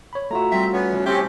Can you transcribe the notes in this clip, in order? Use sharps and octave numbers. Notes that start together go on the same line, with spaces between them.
C#5 B5
A3 F4 F#4 E5 A#5
G3 C4 E5
B3 C#4
B2 E3
A3 C4 C#4 G4 E5